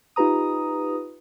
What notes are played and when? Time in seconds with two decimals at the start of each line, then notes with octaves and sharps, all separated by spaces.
0.16 D#4 F4 G4 B4 A#5 D#6